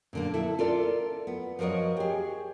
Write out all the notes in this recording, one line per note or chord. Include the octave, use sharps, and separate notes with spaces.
A#2 D3 A#3
E4 A4
F4 A4 A#4 D5
B3
F3 F#4 A#4 C#5 D#5
G4 G#4